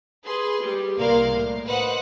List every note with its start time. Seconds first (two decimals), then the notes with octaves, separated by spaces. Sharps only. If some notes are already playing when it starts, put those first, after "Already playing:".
0.24 G#4 B4 C6
0.62 G3
0.97 C2 A#3 A#4 D5 F5 C6
1.35 A2
1.67 B4 C5 D#5 F#5